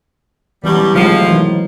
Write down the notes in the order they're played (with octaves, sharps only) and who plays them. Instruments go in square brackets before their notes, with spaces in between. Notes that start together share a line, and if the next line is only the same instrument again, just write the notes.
[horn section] F#2 B2 G3 [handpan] E3 B3
[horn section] A2 C3 F3 [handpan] D#3 F#3 G#3
[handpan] E3 F#3 D#4